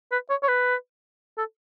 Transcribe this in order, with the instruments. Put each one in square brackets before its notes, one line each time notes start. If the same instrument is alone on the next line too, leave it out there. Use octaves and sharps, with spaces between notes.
[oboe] B4
C#5
C#5
B4
A4